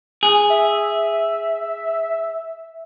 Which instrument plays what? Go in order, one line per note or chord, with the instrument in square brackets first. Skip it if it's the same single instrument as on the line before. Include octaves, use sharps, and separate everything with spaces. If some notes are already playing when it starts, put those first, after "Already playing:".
[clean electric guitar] G#4
[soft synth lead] E5